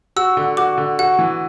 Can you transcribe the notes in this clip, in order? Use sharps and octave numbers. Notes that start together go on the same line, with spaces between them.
F#4 E6
D3
F#4 D6
D3
F#4 F#5
E3